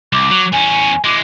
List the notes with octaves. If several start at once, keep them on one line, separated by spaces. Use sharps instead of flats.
C2 D6
F#3
E2 C#4 G#5
E3 G#3 D6